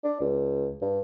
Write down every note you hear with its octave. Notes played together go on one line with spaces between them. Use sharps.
D4
C#2
G2